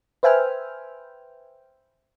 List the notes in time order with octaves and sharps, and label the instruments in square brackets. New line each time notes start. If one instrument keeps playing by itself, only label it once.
[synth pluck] B4 C5 E5 G5 G#5 F6